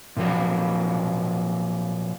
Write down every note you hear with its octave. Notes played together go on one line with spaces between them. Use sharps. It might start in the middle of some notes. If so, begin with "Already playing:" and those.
A#2 F3 F#3